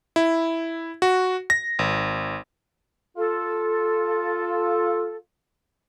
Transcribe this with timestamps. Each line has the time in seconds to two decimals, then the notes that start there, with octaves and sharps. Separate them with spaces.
0.16 E4
1.02 F#4
1.50 A#6
1.79 G#1
3.17 F4 A4